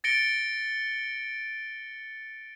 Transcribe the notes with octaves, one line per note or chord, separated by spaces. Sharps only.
A6 A#6 C#7 D7 G7